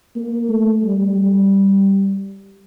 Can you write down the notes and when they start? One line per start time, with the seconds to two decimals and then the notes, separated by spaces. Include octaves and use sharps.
0.16 A#3
0.49 A3
0.83 G3
1.16 G3